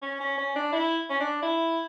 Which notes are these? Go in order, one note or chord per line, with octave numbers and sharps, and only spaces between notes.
C#4
C#4
C#4
D4
E4
C#4
D4
E4